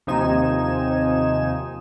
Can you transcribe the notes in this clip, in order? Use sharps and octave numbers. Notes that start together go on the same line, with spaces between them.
D#2 C3 F3 D#4 G#5 E7